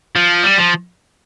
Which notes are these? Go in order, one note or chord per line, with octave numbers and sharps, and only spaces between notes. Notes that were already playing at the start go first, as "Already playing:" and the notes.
F3
G3
F3